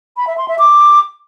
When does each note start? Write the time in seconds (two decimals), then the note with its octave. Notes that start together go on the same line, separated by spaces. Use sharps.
0.17 B5
0.27 E5
0.38 C6
0.48 E5
0.59 D6